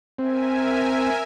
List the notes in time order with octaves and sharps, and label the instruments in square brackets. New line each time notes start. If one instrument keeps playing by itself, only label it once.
[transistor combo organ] C4 [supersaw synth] A#4 E5 G#5